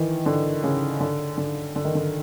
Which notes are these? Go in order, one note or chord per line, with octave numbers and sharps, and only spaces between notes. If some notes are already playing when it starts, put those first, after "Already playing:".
Already playing: D#3 E3
D3
C#3
D3
D3
D3
D#3
D3